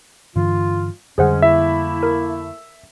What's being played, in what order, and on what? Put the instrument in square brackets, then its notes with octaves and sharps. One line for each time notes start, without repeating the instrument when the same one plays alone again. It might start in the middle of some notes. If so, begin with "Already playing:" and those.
[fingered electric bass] G2 D3 E3 [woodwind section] F4
[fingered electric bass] F2 D3 G3 [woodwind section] G#3 C#4 [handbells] G#4 C5 F#5
[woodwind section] A3 A#3 E4 [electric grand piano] E5
[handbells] A#4